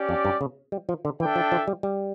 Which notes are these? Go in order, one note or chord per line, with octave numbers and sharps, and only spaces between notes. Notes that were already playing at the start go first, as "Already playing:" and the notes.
Already playing: C#4 G4 D5
F2
G2
C#3
G3
F3
D3
E3 D4 A4 E5 G5
F3
F3
G3
G3